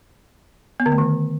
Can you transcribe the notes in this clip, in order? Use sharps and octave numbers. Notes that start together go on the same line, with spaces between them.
B3
D3
A3
D#3